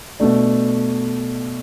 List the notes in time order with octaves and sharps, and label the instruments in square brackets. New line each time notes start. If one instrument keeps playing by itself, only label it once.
[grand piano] B2 A3 D4